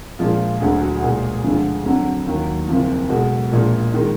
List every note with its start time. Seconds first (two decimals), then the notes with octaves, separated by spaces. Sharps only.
0.19 A#1 A#2 F3 G#3 F4
0.60 D2 D3 F#3 G#4
0.81 F#4
1.02 B1 A#2 G#3 G#4
1.44 D2 D3 F3 G#3
1.85 F2 D3 F#3 F#4
2.26 D#2 D#3 F#3
2.68 F#1 F2 F3
3.09 B1 B2 G#3 F#4
3.51 A#1 A#2 G#3
3.94 D#3 G#3